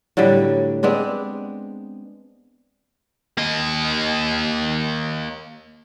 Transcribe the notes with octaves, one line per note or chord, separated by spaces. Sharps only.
A2 D3 F#3 G3
G#3 B3 C4 D4
A#3 D#5